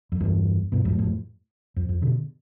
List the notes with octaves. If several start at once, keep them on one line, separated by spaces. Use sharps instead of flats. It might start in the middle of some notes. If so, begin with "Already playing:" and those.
F2
E2 G2
G2 B2
F2 A2
F2 A2
F2
F2
B2 D3